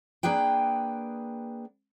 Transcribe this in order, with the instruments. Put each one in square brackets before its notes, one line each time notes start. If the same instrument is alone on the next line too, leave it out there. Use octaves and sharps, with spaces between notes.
[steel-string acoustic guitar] A#3 D4 G#4 B4 G5